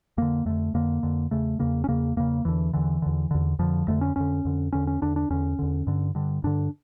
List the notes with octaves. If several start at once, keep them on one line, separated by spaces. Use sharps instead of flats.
F2 D3 A#3
F2 D3 A3
F2 D3 A#3
F2 D3
E2 C#3 A3
E2 C#3 A#3
C#4
E2 C#3 A#3
E2 C#3 A#3
E2 D3 E3
E2 D3 E3
E2 D3
E2 D3
F2 D3 F3
F2 D3 A3
C#4
F2 D3 C#4
F2 D3
E2 D3 C#4
C#4
E2 D3 D4
D4
E2 D3 C#4
E2 D3
G2 D3
G2 D3
G2 D3 D4